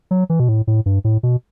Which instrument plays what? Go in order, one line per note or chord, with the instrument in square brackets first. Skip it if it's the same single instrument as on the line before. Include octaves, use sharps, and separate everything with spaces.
[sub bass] F#3
E3
B2
A2
A2
G2
A2
B2